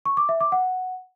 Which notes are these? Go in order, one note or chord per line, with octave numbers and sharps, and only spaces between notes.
C#6
D6
E5
D6
F#5